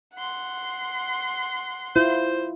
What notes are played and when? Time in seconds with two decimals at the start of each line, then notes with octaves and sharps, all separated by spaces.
0.14 F#5 C6
1.96 E4 F4 C5